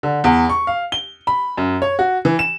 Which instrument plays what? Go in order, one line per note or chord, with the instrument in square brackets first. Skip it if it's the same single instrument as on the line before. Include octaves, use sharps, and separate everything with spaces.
[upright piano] D3
E2
C#6
F5
G7
B5
F#2
C#5
F#4
E3
E7